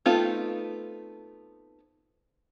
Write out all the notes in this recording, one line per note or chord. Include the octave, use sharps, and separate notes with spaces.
A3 B3 C4 D#4 F4